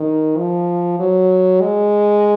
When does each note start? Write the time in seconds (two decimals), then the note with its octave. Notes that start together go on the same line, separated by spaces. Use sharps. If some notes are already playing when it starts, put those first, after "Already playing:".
Already playing: D#3
0.38 F3
0.99 F#3
1.61 G#3